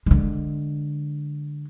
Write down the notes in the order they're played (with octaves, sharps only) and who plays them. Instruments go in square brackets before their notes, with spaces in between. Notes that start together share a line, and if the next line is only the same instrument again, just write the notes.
[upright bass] D3 G#3